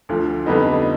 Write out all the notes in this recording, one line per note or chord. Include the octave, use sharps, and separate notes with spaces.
D2 D3 F3
F2 D3 G3 B3 D#4